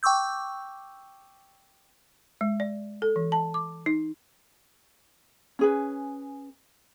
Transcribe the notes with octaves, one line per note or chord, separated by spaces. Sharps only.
G5 C#6 D6 E6 G6
G#3
D5
A4
E3
A5
D6
D#4
C#4 G#4 B4